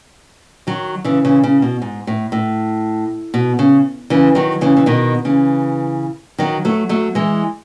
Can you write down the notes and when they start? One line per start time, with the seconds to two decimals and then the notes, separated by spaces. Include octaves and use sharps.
0.67 D#3 F#3
1.04 C#3 E3
1.25 C#3 E3
1.44 C#3
1.62 B2
1.82 G#2
2.07 A2
2.32 A2
3.34 B2
3.59 C#3
4.10 C#3 E3
4.35 D#3 F#3
4.61 C#3 E3
4.77 E3
4.86 B2 D#3
5.25 C#3 E3
6.38 D#3 F#3
6.65 F#3 A3
6.89 F#3 A3
7.15 E3 G#3